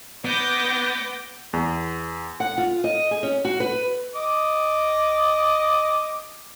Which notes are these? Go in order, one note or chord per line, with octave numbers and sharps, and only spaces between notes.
B3 D6 G6 A#6
E2
F#5
F4
D#5
G#4
C#4
F#4
B4
D#5 D6